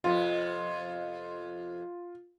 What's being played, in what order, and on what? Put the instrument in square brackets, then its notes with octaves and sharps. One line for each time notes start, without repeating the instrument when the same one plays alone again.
[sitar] F2 C3 B3 [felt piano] F4